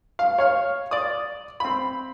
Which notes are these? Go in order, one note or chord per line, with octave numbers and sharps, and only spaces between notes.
F5
C#5 F5 F6
D5 D#6
C4 B5